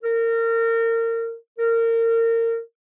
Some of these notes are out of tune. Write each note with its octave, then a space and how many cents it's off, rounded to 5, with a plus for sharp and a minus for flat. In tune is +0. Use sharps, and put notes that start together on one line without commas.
A#4 -30
A#4 -30